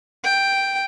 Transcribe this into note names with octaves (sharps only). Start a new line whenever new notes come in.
G5